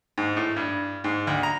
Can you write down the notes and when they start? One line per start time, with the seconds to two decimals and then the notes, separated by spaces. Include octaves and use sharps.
0.18 G#2
0.37 A2
0.56 G2
1.04 G#2
1.27 D2
1.43 A#5